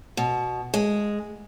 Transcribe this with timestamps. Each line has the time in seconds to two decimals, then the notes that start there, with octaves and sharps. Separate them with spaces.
0.17 B2
0.74 G#3